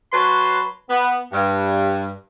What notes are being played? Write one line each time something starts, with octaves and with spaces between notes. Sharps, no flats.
F#3 B4 A5 C6
B3
G2